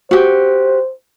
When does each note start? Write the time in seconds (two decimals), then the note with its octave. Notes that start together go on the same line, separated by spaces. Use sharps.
0.11 F#4 G4 C5